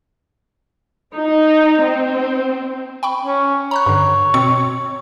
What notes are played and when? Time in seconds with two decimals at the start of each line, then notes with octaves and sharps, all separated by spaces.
1.13 D#4
1.81 C4
3.03 G5 B5 C#6
3.22 C#4
3.71 C#5 A#5 B5 F#6
3.86 G2 D3
4.34 B2 C4 C#7